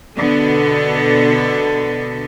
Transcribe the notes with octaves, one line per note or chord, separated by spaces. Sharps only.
B2 D3 B3 A4